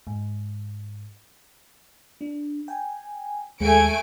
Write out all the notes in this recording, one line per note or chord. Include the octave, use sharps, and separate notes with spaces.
G#2
D4
G5 G#5
D#2 G#3 A3 G#5 D7